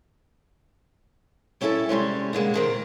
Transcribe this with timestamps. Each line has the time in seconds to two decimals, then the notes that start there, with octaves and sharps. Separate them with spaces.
1.61 G3 C#4 E4 G#4 A4 E5
1.89 C3 G3 G#3 C#4
2.33 B2 D3 G#3 A#3
2.54 C3 D#3 C4